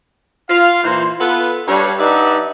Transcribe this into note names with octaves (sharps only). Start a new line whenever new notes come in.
F4 F5
A#2 E3 C5
B3 F4 A4 B4
G2 G3 C#5
G2 D#4 B4 D5 E5 F#5